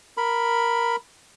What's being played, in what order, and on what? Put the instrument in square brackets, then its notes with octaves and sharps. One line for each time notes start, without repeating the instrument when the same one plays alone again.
[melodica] A#4 B5